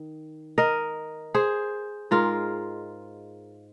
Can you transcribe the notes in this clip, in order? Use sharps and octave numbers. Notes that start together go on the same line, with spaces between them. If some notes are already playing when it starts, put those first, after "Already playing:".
Already playing: D#3
A#4 D#5
G#4 C5
G#2 G#3 F4 A#4